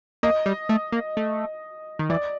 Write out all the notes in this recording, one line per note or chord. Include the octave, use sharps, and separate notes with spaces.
A#3 D#5
G3
A3
A#3
A3
D#3
E3 D5